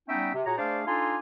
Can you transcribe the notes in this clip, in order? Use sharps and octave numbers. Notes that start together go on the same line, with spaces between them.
G3 B3 C#4 D#4 E5 G5
C3
A#2 F#4 G#4 C#5 A#5
A3 D4 G#4 C5 D5 F5
D4 D#4 F4 A4 G#5 C6